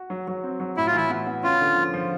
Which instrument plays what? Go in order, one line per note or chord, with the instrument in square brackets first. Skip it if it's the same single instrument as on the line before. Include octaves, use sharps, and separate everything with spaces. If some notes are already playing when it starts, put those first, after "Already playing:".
Already playing: [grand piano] F#4
F#3
F#3
C4
F#3
[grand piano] A2 [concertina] E4
[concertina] F4
[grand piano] E3 [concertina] E4
[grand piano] B3
B3
[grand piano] C#4 [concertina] F4
[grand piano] D3
F3
F3